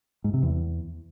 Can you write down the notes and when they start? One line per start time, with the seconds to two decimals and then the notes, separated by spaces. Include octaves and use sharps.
0.24 G#2
0.34 C3
0.43 E2